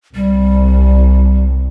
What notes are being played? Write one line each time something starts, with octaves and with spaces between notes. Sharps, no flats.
C2 G3